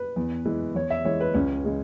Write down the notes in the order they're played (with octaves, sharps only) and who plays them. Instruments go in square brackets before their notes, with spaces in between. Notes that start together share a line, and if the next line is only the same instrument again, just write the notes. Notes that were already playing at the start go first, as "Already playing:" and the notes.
Already playing: [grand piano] B4
E2
E3 G#3
E2 C#5
E5
E3 G#3 C#5
B4
C#2 C#4
C#3 G#3